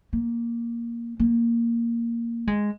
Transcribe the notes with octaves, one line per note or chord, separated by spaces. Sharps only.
A#3
A#3
G#3